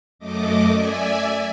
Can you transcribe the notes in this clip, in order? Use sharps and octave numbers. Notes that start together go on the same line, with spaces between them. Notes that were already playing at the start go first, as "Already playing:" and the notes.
F#2 A3 D#5 D6
D5 E5 G#5